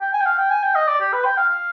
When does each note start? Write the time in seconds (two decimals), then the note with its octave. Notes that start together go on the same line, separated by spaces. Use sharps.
0.01 G5
0.13 G#5
0.21 G5
0.26 F5
0.38 G5
0.51 G#5
0.63 G5
0.75 D#5
0.87 D5
1.00 G4
1.13 B4
1.25 G5
1.38 F5
1.50 F5